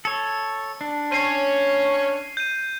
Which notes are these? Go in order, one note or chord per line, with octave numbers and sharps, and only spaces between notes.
A4 C#5 C#7
D4
C#4 C#5 C7 D#7
G6 D#7